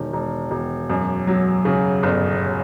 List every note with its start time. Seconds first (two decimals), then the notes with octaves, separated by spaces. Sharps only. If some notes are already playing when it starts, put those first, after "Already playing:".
Already playing: E1 D#3
0.13 E1
0.51 E1
0.90 F#2
1.27 F#3
1.65 C#3
2.03 G1